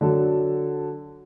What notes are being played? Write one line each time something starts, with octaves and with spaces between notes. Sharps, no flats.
D3 F#3 A4